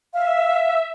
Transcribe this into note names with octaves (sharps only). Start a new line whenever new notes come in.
E5 F5